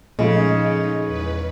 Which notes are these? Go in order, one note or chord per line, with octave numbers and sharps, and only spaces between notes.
A#2 C#3 F3 G#3 A3 D#4
E2 B4